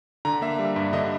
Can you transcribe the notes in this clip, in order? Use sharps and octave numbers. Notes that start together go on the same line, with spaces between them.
D3 A#5
A#3 E5
G3
G2 E5
D3 D#5